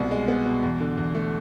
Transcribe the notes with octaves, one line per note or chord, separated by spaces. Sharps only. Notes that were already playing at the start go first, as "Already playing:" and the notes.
Already playing: C2 B2 B3
G#3
B3
B2
E2
D3
E2
A3